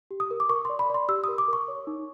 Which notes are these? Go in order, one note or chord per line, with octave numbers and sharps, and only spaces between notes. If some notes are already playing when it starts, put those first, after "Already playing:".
G4
D#6
A#4
D6
A#4 C#6
C6
D5
B5
D5 C6
G4 E6
D#6
A#4
D6
A#4 C#6
C#5
D#4